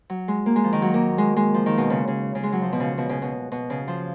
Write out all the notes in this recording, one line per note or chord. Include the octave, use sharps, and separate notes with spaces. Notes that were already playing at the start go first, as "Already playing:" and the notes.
F#3
G#3
A#3
G#3
F3
D#3
F#3
A#3
G#3
G#3
F3
D#3
B2
C#3
C#3
C#3
G#3
F#3
F3
B2
C#3
B2
C#3
B2
B2
C#3
F3